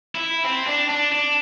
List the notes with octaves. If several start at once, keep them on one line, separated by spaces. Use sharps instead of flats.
E4
C4
D4
D4
D4